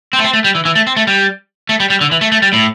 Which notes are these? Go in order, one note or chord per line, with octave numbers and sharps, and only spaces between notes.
C4
A3
C4
A3
G3
E3
E3
A3
C4
A3
G3
A3
G3
G3
D3
E3
A3
A3
G3
A2